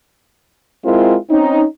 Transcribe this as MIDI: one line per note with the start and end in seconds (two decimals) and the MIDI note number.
0.85 1.16 56
0.85 1.16 60
0.85 1.16 64
0.85 1.16 65
0.85 1.16 70
1.30 1.64 60
1.30 1.64 61
1.30 1.64 63